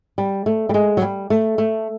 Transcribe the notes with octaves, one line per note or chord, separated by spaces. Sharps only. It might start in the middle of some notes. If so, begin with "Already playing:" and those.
G3
A3
G3
G#3
F#3
G3
A3
A3